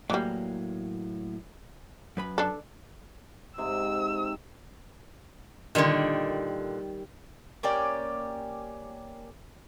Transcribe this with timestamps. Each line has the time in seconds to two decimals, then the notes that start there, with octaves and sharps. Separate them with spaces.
0.10 A2 E3 F#3 G3 A#3
2.17 F#2 B4 B5
2.38 D4 A4
3.58 G#2 C3 D#5 E6
5.75 A#2 D3 D#3 G3
7.63 A#3 C#4 G4 D5